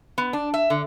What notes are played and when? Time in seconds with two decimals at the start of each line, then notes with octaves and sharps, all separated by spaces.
0.18 B3
0.33 D4
0.54 E5
0.70 D3